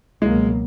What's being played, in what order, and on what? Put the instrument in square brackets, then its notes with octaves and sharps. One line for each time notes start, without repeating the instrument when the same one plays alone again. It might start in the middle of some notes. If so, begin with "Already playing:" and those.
[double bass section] C#2 B2 F#3 A#3 [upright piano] G#3